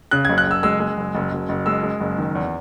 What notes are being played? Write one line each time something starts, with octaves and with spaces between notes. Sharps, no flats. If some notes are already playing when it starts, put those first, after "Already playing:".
C#3 F#6
F#1 G#6
F#6
F#1 E6
G#3 E6
G#3
F#1
F#1
F#1
F#1
G#3 E6
G#3
F#1
D#3
E2